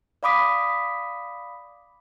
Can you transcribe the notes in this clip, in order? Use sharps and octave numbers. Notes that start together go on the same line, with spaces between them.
D5 F5 B5 D6 D#6 B6